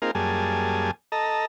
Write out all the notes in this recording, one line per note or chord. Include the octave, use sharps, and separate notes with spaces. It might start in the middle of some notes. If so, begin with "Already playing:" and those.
A#3 C4 D#4 F4 G#4 A#4
F#2 G3 A#3 G#4 G#5 A5
A4 D#5 A5 A#5